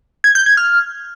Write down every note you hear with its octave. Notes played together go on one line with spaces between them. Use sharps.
G#6
G6
G#6
F6